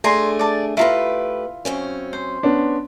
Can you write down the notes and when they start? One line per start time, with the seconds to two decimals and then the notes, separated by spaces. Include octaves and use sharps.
0.04 A3 D4 G#4 G#5 A#5 C6
0.39 D5 A5
0.77 A3 E4 F4 G4 B4 A#5
1.65 F#2 C4 C#4
2.13 C5
2.43 B3 C#4 D4